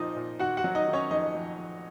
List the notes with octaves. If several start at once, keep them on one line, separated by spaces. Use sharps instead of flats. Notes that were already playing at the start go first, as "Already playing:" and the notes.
Already playing: A#2 F3 C4 D#4 D#5
A#2
D#3 F#4 F#5
F#4 F#5
F#3
D#4 D#5
D#3
C#4 C#5
F2 D#4 D#5
F2
F2